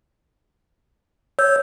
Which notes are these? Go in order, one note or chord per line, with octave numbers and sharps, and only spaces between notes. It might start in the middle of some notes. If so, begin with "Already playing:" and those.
C#5 E6 G6